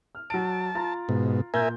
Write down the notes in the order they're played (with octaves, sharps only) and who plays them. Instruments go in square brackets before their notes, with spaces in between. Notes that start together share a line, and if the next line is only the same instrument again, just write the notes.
[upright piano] F6
[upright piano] F#3 D7 [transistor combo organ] A5
[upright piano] F4 A#5 A6
[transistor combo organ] G#2 B2
[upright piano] A#2 G6 [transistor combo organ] A#4 E5 G#5